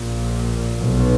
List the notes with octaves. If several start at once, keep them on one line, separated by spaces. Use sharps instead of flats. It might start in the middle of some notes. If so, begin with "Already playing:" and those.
Already playing: A#1 A#2
B1 B2